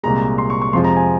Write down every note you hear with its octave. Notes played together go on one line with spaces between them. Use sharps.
C2 A#2 G#3 A#5
C6
C#6
C#6
F2 C3 F3 G#3 C6
A#5
G#5